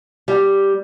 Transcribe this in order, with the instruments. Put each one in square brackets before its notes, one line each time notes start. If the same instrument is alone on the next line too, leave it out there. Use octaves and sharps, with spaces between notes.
[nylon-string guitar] G3